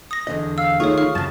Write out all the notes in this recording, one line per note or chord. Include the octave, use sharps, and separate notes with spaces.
D#6 A#6
E2 D3 D#5
F5 E6
D#3 A3 F4 G#4 C#5 C#6
F5 C#6 F6
F#2 C#3 A5